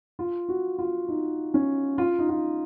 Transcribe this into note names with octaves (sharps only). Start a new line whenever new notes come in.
F4
F#4
F4
D#4
C#4
F4
D#4
F4